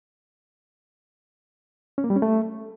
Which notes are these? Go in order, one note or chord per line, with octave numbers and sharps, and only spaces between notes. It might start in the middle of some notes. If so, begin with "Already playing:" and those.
C#4
A#3
G3
C#4
A3